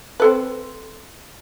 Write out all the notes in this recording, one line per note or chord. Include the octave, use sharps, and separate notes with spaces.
C4 A4 B4